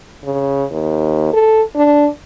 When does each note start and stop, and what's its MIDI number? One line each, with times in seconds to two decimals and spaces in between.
0.24 0.64 49
0.71 1.31 39
1.33 1.62 69
1.76 2.08 62